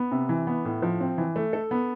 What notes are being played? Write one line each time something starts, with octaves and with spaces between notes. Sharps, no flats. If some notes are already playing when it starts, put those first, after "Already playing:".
Already playing: B3
C3
E3
B3
A2
F3
C4
E3
A3
A4
B3